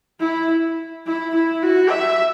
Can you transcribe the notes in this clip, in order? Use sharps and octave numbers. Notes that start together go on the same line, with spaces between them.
E4
E4
E4
F#4
E5